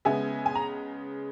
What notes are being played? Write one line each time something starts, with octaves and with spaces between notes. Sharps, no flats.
C#3 G#3 B3 E5 G#5
G#5
A#5